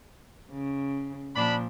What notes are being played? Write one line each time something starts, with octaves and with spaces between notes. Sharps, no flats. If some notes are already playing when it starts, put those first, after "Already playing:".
C#3
A#2 F3 D4 B5